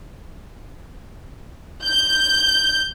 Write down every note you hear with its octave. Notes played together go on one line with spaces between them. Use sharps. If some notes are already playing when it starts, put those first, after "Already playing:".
G6